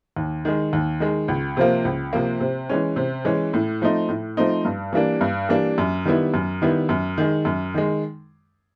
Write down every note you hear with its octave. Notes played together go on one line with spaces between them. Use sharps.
D#2
D#3 G#3
D#2
D#3 G#3
C#2
C3 F3 A#3
C#2
C3 F3 A#3
C3
E3 G#3 C#4
C3
E3 G#3 C#4
A2
F3 A3 C4 D#4
A2
F3 A3 C4 D#4
G2
E3 G3 A#3 D4
G2
E3 G3 A#3 D4
F#2
D#3 G3 B3 E4
F#2
D#3 G3 B3 E4
F#2
D#3 G#3
F#2
D#3 G#3